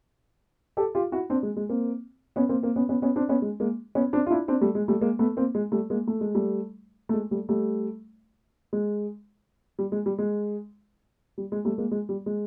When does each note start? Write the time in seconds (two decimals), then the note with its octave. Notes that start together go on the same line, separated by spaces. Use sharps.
0.77 G4 A4
0.95 F4 G4
1.12 E4 F#4
1.30 C4 D4
1.43 G#3
1.57 G#3
1.69 A#3 C4
2.36 B3 C#4
2.49 A#3 C4
2.63 A#3 C4
2.76 B3 C#4
2.89 B3 C#4
3.02 B3 C#4
3.16 C4 D4
3.29 B3 C#4
3.42 G#3
3.60 G#3 A#3
3.95 B3 C#4
4.13 C4 D4
4.26 F4
4.30 D4 E4
4.48 C4 D4
4.61 G3 A3
4.75 G#3
4.88 G3 A3
5.01 G#3 A#3
5.19 A3 B3
5.37 A#3 C4
5.55 G#3
5.72 G3 A3
5.90 G#3 A#3
6.07 A3
6.21 G#3
6.35 G3 A3
7.09 A3
7.14 G#3
7.31 G3 A3
7.49 G3 A3
8.73 G#3
9.79 G3
9.92 G#3
10.06 G3
10.19 G#3
11.38 G3
11.52 G#3
11.65 G3 A3
11.78 G#3 A#3
11.91 G#3
12.09 G3
12.26 G#3